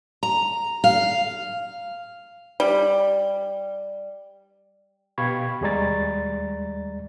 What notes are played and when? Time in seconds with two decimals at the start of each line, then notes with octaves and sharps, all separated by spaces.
0.23 A#5
0.84 F5
2.60 G3
5.18 B2 G4 F5 B5 C#6 G#6
5.61 D#2 G3 G#3 D5 A#5 A6